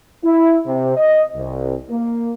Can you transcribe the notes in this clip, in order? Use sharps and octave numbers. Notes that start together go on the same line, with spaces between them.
E4
C3
D#5
C2
A#3